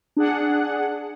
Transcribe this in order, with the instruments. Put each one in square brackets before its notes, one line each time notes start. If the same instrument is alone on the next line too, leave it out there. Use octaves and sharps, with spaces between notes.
[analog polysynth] D4 G#4 F#5